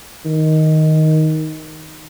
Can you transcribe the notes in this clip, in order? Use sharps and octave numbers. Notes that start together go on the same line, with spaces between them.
D#3